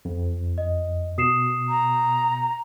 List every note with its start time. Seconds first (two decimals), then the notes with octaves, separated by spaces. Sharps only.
0.05 F2
0.58 D#5
1.18 B2 D#6 C7 E7
1.69 A#5